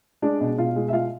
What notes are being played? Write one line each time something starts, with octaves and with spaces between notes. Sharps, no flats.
G#3 D4 D5
B2
B2 F4 F5
G#3
E5
G#3 F4 F5